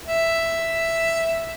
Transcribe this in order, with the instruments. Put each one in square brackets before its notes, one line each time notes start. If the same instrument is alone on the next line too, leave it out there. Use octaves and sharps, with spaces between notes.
[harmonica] E5